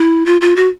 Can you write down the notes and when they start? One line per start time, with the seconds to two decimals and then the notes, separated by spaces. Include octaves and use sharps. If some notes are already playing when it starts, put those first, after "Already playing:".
Already playing: E4
0.26 F4
0.41 F4
0.56 F#4